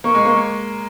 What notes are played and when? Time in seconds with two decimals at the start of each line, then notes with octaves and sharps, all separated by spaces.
0.04 A#3 C#6
0.15 G#3
0.25 A#3